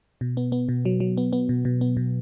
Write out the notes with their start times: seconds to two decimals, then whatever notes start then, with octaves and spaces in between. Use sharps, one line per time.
0.21 B2
0.37 B3
0.52 B3
0.69 B2
0.85 F#3
1.00 F#3
1.17 B3
1.33 B3
1.49 B2
1.65 B2
1.81 B3
1.97 B2